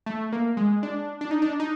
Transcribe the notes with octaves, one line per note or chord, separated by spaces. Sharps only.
A3
A#3
G#3
D4
D4
D#4
D4
D#4